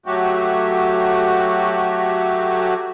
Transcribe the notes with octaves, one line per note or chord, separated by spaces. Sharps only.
F#3 A3 F#4 G4